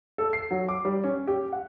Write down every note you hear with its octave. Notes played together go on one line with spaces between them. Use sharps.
A4
C7
F#3
D6
G3
C#4
G4
F#5